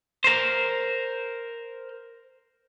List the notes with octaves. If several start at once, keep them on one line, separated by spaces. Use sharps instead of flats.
A#4 C5